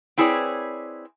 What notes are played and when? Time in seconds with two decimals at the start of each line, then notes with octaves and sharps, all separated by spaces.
0.18 C4 E4 G#4 B4 C#5 D5